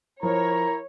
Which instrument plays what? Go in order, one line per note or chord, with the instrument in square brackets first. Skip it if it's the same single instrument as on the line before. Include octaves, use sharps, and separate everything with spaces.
[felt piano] F3 [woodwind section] E4 A#4 [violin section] C#5 [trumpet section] A#5